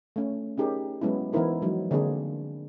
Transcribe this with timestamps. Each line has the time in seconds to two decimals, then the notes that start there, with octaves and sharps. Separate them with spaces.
0.16 A3 C#4
0.58 C#4 D#4 G4 G#4 A#4
1.01 F#3 G#3 B3 C#4 E4
1.33 E3 B3 D#4 E4 A#4 C5
1.62 F3 F#3 G#3 D#4
1.91 D3 A#3 C4 D4 G#4